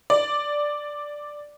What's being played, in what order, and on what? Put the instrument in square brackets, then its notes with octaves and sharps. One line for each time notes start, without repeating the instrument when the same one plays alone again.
[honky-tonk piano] D5